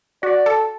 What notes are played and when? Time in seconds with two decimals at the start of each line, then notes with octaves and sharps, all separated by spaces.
0.23 F#4 D5
0.46 A4